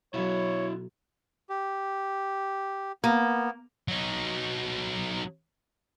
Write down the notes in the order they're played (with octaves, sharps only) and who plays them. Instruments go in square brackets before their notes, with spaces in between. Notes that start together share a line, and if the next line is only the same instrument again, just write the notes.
[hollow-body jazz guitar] B1 F#3 [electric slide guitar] E4 F#4 E5 [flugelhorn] C#5
[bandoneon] G4
[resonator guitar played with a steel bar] A#3 [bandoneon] B3
[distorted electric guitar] F#3 D#4